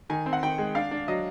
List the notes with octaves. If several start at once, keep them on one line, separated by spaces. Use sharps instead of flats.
D#3 G#5
C4
F#5
D#3 G5
G#3
D4 F5
D4
F#3 D#5